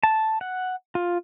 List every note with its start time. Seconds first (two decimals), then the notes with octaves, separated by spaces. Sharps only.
0.03 A5
0.41 F#5
0.95 F4